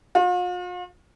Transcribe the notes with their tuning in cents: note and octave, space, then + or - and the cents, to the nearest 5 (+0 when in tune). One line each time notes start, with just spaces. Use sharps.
F4 +45